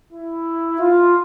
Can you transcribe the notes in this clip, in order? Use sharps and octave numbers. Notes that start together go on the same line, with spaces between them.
E4
F4